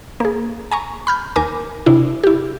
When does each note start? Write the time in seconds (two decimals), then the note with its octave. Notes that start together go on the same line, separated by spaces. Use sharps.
0.20 A#3 G#4
0.71 G#5 A#5 C#6
1.07 B5 F6 G6
1.36 D#2 A#4 G#5 D6
1.86 C3 D4 E4
2.23 E4 G4